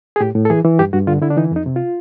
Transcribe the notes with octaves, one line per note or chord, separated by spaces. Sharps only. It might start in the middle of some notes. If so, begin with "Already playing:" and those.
G#4
A2 G4
A2
A4
E3 G#4
E3
G2 G4
G2 F#4
D3 F4
D3 E4
D4
E3 D#4
F2 D#4
C3
F4